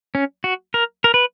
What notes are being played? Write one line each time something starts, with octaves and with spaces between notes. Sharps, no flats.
C#4
F#4
A#4
A#4
B4